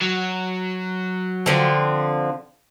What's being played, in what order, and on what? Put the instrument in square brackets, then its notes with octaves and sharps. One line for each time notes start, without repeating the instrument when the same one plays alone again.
[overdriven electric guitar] F#3
[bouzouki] D3 F3 C4